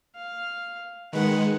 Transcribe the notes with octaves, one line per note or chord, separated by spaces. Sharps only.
F5
D#3 G#3 B4 F#5